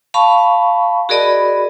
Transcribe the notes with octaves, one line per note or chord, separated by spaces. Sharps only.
F5 A5 B5 C#6
F#4 G#4 A#4 D5 D#5 B5